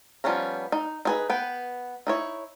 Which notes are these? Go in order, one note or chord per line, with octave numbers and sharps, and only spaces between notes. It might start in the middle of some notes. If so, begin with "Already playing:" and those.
F3 G3 B3 C#4 A#5
D#4
D#4 G#4 B4
B3 B4 G5
D#4 E4 C#5